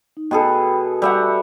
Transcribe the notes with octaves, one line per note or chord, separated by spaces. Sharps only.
D#4
B2 G#4 A4 G5 B5
G3 E5 F#5 C#6 E6